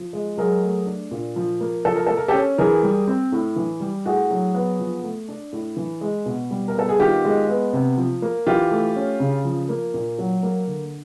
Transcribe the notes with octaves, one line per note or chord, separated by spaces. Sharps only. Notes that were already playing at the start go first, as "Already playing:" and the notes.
Already playing: F3
G#3
F#3 G#4 A#4
A3
D4
A#2
F3
A#3
F3 A4
A#4
A#3 A4
A#4
G4 A4
C#4
E3 G#4 A#4
G3
C4
A2
E3
G3
A2 F#4 G#4
F#3
B3
F3
A3
D4
A2
E3
G#3
B2
G3
A#4
B3 A4
G#4
D#3 F4 G4
G#3
B3
C3
F3
A#3
E3 F4 G4
A3
C#4
C#3
F3
A#3
A#2
F#3
A#3
D3